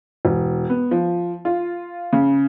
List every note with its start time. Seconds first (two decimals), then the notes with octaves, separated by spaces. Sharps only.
0.25 E1
0.70 B3
0.91 F3
1.45 F4
2.13 C#3